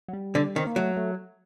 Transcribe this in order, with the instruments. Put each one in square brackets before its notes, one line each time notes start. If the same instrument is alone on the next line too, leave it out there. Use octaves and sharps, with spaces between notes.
[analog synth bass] F#3
G3
[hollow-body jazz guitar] D3
[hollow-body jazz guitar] D#3 [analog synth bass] C4
[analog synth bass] A#3
[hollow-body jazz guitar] F#3 [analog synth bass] A3
[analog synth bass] A3